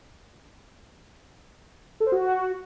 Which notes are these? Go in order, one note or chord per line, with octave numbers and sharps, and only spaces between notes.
A4
C5
F#4